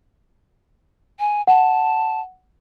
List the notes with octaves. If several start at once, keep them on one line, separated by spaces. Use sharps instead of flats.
G#5
F#5 A5